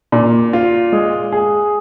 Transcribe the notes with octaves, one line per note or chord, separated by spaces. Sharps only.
A#2
F4
G#3
G#4